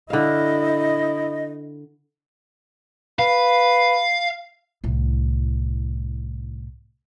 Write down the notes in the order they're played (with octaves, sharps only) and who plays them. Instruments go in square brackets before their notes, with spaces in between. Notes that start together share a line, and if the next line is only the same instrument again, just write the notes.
[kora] D3 F5 [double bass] E4 [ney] D#5
[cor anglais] B4 [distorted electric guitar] F5
[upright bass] C2 A2